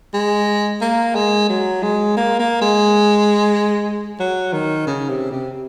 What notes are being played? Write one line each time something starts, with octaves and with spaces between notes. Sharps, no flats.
G#3
A#3
G#3
F#3
G#3
A#3
A#3
G#3
F#3
D#3
C#3
C3
C3